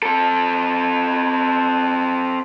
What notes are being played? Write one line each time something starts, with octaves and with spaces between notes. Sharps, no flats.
C4 A4